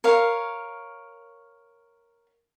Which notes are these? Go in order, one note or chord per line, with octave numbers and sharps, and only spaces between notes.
A#4 C#5 F5